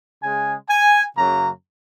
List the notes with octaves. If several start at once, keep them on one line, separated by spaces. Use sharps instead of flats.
C#3 G#3 G#5
G#5
F#2 C#3 F#3 A#3 A#5